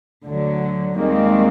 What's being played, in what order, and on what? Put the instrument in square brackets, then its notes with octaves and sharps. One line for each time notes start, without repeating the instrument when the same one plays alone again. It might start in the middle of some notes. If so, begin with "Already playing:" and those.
[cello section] D2 D3 F#3
[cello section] D#2 D#3 G3 C4 [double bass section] G#3 A#3